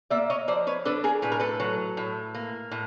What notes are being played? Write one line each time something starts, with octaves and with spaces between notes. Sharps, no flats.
A#3 D5 E5
C#5 D#5
F3 C5 D5
B4 C#5
D4 A4 B4
G#4 A#4
A2 B4
A#4
A4 B4
F#3
A2
A#3
A2